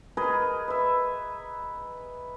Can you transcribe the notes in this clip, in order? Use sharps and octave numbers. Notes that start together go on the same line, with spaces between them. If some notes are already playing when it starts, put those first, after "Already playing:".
G#4 A#4 B4 D#5
B4 E5